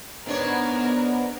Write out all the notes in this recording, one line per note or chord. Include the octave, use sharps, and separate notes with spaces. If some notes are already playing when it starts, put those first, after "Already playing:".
G#2 B3 D4 A#4 C#5 D5